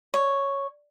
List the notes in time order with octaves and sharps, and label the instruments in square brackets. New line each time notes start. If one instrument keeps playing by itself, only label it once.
[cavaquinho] C#5